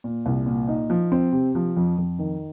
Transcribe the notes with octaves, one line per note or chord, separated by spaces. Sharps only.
A#2
C2
A#2
D#4
F3
C4
C3
F3
F2
F2
D#3